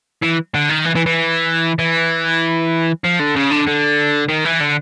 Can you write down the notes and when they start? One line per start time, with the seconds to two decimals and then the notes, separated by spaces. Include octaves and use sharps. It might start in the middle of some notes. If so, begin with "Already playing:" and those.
0.22 E3
0.54 D3
0.69 D#3
0.85 E3
0.95 E3
1.06 E3
1.79 E3
3.04 F3
3.19 D3
3.35 C#3
3.50 D3
3.67 D3
4.29 D#3
4.45 E3
4.60 D3